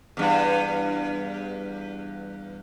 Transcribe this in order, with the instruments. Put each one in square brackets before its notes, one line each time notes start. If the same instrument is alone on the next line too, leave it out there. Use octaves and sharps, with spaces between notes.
[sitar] E2 G2